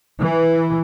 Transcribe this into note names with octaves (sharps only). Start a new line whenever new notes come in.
E3